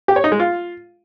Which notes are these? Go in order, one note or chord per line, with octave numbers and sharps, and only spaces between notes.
G4
C#5
D#4
G#3
F4